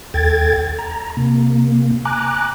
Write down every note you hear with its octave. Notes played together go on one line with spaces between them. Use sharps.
D#2 A4 G5 G#6 A6
A#5
C3 A#3
G#5 A#5 D6 F#6